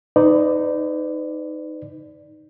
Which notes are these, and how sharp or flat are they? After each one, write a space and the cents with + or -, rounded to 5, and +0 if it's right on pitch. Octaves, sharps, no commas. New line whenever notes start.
D#4 +0 B4 +35 D5 +0